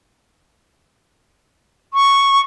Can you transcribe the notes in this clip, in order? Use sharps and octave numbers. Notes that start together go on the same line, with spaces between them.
C#6